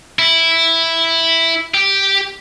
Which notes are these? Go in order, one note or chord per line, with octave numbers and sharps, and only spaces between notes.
E4
G4